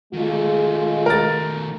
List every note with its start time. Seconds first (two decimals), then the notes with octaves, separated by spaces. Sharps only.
0.14 D#3 G#3 A3 F4
1.06 A#4 A6